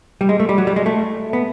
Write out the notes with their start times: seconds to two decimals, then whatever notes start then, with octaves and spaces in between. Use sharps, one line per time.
0.21 G3
0.29 G#3
0.40 A3
0.49 G3
0.58 F#3
0.67 G3
0.76 G#3
0.86 A3
1.33 B3